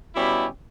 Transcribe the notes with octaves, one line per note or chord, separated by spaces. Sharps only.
B2 G3 C#4 E4 G4